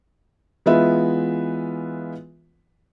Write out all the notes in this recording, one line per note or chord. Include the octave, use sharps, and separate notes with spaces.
E3 G#3 B3 F4 B4 E5